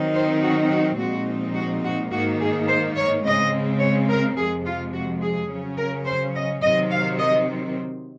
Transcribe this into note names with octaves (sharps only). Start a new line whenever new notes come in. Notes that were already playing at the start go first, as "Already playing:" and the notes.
Already playing: D#3 F#3 C4 D#4
C5
F#4
F#4
A#2 F3 G#3 C4 D#4 F#4
F#4
F#4
G#2 D#3 A#3 D#4 F#4
G#4
C5
C#5
C#3 G#3 C4 D#5
C#5
A#4
F2 C3 F3 G#3 G#4
F4
F#4
G#4
C#3 F#3 C#4
A#4
C5
D#5
C3 D#3 F#3 C4 D#5
F5
D#5